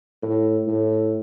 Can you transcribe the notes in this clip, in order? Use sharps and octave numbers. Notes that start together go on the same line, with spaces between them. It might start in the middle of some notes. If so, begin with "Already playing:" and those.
A2
A2